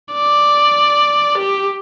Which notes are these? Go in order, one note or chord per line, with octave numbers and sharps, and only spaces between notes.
D5
G4